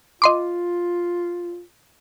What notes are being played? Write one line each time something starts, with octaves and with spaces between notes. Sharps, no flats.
F4 D#5 C6 D6